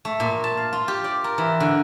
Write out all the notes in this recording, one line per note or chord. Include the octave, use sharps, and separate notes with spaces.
A3
A#2
A5
F5
F4
G4
D5
A#4
E3
D3